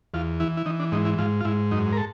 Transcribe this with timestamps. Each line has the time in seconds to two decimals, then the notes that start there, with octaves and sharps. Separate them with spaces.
0.14 E2 F4
0.40 E3 E4
0.57 E4
0.66 E3 D#4
0.80 D4
0.92 G#2 D#4
1.05 E4
1.18 G#2 F4
1.41 F4
1.45 G#2 E4
1.71 F#2 D#4
1.92 A#4
1.97 A4